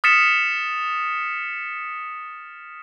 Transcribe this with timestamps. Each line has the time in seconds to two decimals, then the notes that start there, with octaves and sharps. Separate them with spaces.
0.04 D#6 F6 A6 B6 C#7 E7